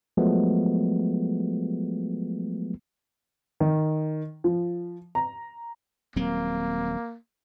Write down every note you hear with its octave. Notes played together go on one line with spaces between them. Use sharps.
F3 F#3 G#3 A3 B3
D#3
F3
A#5
D#1 F#3 A#3 C4